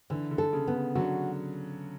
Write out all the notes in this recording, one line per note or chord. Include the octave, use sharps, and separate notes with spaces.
D3 E3
D3
A4
C#3
B3
D3 F#3 F#4